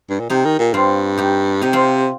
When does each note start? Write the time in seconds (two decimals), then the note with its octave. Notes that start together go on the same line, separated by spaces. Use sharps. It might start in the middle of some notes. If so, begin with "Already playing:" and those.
0.10 G2
0.20 A#2
0.30 C3 D#4 G4
0.45 D#3
0.59 A#2
0.74 G2 C4 F4
1.17 D#4 G4
1.62 C3 D#4 G4
1.73 C4 F4